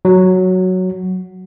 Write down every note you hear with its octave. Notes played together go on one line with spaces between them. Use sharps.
F#3